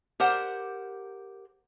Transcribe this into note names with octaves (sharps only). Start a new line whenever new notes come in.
G4 A#4 C5 F#5